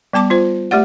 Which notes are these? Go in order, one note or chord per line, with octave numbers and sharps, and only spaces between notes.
G3 B3 A5 D6
F4 C5
A3 G4 D5 F#5